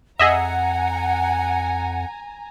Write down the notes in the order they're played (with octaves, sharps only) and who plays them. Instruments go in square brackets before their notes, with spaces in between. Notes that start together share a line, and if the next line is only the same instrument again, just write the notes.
[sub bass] F2 [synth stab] G#4 D#5 E5 [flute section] F#5 [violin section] G#5 A#5